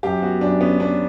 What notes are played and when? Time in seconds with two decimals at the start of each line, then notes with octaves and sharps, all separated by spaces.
0.03 F#2 G4
0.22 B3 F#4
0.41 F#2 D4
0.61 B3 C#4
0.80 B3 D4